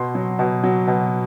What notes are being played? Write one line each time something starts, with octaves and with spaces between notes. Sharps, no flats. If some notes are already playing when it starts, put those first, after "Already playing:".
Already playing: B2 C6
F#3
B2
F#3
B2